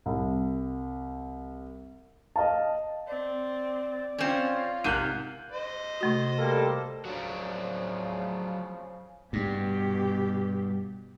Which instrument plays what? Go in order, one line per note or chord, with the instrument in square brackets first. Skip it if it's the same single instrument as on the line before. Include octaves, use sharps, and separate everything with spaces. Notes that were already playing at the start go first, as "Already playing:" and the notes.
[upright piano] C2
D#5 F5 A5
[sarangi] C4 [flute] D5
[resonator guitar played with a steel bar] C4 C#4 [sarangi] F4
[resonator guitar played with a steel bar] G#2 C3 [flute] A#4 [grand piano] F#6 G6 D#7
[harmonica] C5 D#5
[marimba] C3 A3 F#4
[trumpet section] G3 A#3 A4
[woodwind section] C#3 F3 [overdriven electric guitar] F#3 D4
[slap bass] G2 [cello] B2 G4